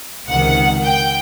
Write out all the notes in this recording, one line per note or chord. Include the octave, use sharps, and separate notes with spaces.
C#2 C3 D#3 F#5
G5